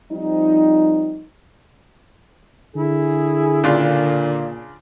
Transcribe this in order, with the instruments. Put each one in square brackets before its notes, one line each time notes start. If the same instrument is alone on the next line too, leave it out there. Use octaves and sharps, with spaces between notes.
[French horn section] F3 G3 C4 D#4
[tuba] D3 [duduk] E4 [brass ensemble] G#4
[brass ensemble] A#2 [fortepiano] C#3 D4 F4